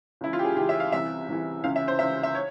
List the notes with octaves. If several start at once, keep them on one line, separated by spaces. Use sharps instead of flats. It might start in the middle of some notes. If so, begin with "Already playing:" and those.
C#2 C#3 E3 E4
F4
G4
G#4
C#2 C#3 E3 G4
E5
F5
C2 C3 E3 E5
C2 C3 E3
C#2 C#3 E3 F5
E5
C5
C#2 C#3 E3 E5
E5
C#5